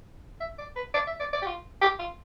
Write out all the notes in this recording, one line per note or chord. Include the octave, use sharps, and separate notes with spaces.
E5
D5
B4
D5
E5
D5
D5
G4
F4
G4
F4